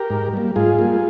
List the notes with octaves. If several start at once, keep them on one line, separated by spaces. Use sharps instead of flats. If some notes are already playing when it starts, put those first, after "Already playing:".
Already playing: G4 A#4
G#2
G3 A#3
G#2 F4 G#4
G3 A#3